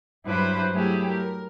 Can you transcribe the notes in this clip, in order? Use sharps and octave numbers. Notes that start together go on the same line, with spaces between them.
G2 F#3 E4 B4 C5 B5
F#3 A3 E4 G4 G#4
A#4